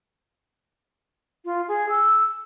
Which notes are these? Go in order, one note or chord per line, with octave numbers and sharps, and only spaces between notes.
F4
G#4
E6